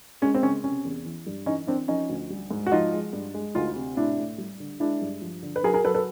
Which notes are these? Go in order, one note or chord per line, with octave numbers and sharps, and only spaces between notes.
G#3 C#4
C4
C#3 C#4
C3 C#4
E2
E3
G2
E3 C#4 D#4
E3 C4 D4
F3 C#4 D#4
D2
G3
G#2
F#4
F3 D#4 F4
G#3
G2
G#3
D2 D#4 F4
C3
A2 D4 E4
A2
G3
D3
G#3 D4 E4
G2
F3
D3
B4
F#3 G#4 A#4
G#4 A#4
F#3 A4 B4
A4 B4